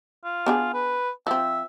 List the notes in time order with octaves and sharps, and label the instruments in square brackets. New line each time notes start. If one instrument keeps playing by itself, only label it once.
[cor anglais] F4
[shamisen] B3 D4 G#4
[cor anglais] B4
[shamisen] F3 C4 [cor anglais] E5